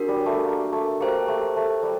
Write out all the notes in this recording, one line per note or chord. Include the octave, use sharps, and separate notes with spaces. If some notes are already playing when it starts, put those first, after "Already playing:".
Already playing: D4 F#4 A#4
G3
A3
A#3
A3
A#3 G4 C5 G5
A3
A3
G3